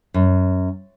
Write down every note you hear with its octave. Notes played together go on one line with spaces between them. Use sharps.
F#2